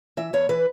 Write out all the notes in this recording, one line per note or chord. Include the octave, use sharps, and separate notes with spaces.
E3 E5
E2 C#5
E3 B4